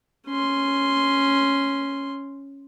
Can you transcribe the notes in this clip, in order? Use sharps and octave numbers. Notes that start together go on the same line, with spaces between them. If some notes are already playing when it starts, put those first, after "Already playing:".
C#4 C6